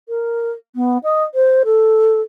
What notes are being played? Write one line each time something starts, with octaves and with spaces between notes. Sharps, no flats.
A#4
B3
D#5
C5
A4